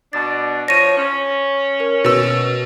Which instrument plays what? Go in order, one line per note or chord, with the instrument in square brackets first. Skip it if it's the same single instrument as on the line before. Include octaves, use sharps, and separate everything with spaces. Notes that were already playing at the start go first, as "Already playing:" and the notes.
[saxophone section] B2 D4 [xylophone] A6
[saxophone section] F3 C#5 [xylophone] A#6 D#7
[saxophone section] C#4
[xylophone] A#4
[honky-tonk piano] B2 E6